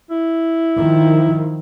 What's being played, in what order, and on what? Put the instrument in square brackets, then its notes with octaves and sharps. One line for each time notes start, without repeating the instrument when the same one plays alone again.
[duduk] E4
[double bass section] D#3 F3